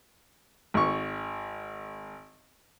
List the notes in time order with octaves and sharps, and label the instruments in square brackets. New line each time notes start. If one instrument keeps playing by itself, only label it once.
[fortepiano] G#1 C#6